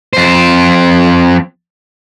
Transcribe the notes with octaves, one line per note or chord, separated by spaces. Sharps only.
F2 C5